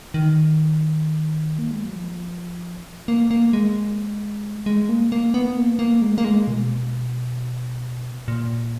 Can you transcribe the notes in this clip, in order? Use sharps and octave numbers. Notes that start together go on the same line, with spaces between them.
D#3
A#3
G#3
F#3
F3
A#3
A#3
G#3
G#3
A#3
A#3
B3
A#3
A#3
G#3
A#3
G#3
B2
A#2